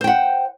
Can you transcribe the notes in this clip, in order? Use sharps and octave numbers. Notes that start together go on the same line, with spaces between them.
C5 F#5 G5